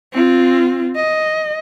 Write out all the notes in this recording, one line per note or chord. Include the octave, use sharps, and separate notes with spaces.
C4 F4
D#5